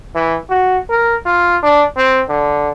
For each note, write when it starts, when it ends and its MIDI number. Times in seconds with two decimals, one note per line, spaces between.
0.15 0.37 52
0.50 0.78 66
0.90 1.16 70
1.26 1.57 65
1.63 1.83 62
1.97 2.21 60
2.29 2.70 50